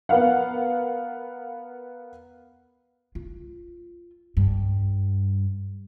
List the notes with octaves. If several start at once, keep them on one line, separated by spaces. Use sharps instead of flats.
B3 A#4 F5 F#5
F4
G2